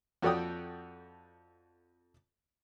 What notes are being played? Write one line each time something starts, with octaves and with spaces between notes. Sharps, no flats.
F2 F#4 A4 D5 G5 D#6